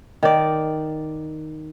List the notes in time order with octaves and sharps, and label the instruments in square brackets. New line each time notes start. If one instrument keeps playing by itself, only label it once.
[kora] D#3 D5